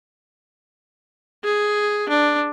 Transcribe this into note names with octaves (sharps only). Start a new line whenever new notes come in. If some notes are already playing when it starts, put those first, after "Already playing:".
G#4
D4